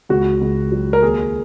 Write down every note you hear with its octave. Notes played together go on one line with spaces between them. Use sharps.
C#2 F#4
C#2
F#3
A#4
D#2 G#4